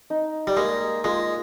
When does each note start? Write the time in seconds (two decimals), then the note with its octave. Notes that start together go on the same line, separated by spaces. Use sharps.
0.10 D#4
0.47 G3
0.57 G#3 A#3
1.04 G#3 F4